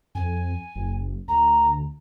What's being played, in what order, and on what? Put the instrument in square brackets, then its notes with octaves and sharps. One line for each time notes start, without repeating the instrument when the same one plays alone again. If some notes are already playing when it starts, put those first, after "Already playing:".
[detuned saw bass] F2 [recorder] G#5
[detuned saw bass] F#1
[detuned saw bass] D2 [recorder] A#5